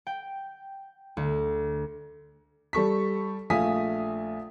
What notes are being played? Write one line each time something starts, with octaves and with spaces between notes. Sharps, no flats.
G5
D2
G3 A4 C#6 B6
A#1 A3 F5 G#5 D#6 B6